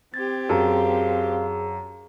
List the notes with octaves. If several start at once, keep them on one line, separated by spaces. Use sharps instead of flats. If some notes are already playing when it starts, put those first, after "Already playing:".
C4 G4 G#6 A6
F#2 G#4 F5 A5